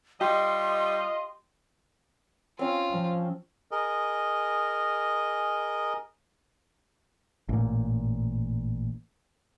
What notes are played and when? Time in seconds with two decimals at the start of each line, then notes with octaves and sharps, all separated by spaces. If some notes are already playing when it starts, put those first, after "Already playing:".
0.21 G3 F4 G4 D#5 C6
2.59 C4 C#4 F4 G#5
2.91 F3
3.71 G#4 A#4 D#5
7.49 A1 A#2